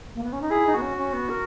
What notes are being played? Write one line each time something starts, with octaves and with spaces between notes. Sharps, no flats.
A#3
B3
C#4
D#4
E4 G#4
D#4
B3 F#4
C#4
C#4
B3
A#4